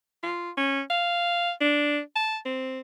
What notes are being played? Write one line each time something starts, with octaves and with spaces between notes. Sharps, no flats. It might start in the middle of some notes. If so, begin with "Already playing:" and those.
F4
C#4
F5
D4
A5
C4